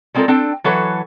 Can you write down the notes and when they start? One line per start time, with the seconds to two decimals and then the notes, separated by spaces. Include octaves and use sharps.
0.14 G3 G#3 C4 F4 A4 A#4
0.28 C4 D4 A4 G5
0.64 E3 F#3 A4 B4 C#5